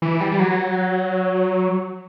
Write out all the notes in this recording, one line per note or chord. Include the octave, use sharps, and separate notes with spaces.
E3
G3
G3
F#3